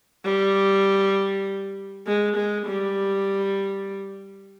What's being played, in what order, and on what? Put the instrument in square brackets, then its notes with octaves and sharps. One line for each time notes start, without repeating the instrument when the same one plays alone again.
[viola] G3
G#3
G#3
G3